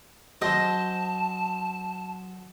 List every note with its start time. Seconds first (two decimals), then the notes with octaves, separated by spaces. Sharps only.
0.41 F#3 C#4 C5 D#5 A5